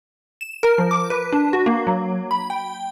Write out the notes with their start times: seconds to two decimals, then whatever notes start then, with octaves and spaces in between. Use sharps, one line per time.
0.41 E7
0.63 A#4
0.78 F3
0.91 D6
1.10 B4
1.33 D4
1.53 F#4
1.66 A#3
1.87 F#3
2.31 B5
2.50 G5